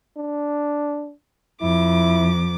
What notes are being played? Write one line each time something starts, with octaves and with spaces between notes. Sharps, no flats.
D4
F2 E4 D6